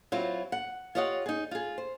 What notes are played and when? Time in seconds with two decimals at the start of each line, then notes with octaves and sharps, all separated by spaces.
0.12 F#3 C4 E4 F4
0.52 F#5
0.95 F4 G4 C#5 D#5 F5 F#5
1.26 D#4 G#4
1.51 F4 G#4
1.78 C5